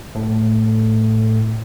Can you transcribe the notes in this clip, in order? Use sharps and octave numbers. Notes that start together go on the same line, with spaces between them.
A2